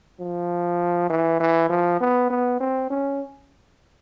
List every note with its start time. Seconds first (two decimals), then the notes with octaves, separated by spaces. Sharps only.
0.20 F3
1.10 E3
1.40 E3
1.70 F3
2.00 B3
2.30 B3
2.60 C4
2.90 C#4